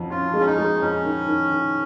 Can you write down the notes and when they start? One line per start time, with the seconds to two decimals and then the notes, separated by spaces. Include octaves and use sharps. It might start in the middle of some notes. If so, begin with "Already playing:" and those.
Already playing: F2 C#4
0.10 C#4 F4
0.34 G#3
0.40 C#4
0.47 D#4
0.58 G#3
0.81 F2 C#4
1.04 D#3
1.28 D#3
1.51 D#3